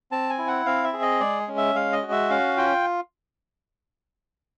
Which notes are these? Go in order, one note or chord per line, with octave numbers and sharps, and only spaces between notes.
C4 A5
G#5
E4
F#5
C4 F5
E5
G#4
D#5
G#3 D5
C#4
E5
G#3 F5
D#5
F#4
E5
C#4 F5
F4 G5